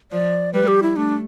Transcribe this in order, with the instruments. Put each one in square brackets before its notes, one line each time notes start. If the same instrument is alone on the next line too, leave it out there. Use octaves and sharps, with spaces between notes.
[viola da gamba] F3 [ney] D5
[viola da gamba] G3 [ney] B4
[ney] G4
E4
[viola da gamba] A3 [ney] D4